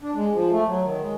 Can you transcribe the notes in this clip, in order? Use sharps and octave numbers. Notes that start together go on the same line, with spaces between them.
D4
G#3
F3
A3
F#3
D#3
G#3